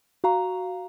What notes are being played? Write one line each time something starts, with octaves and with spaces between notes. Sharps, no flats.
F#4 F5 A#5